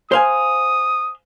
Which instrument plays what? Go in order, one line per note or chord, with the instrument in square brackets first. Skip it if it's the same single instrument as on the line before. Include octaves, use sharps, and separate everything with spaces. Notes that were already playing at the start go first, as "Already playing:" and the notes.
[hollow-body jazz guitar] C5 F5 G#5 [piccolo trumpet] D#6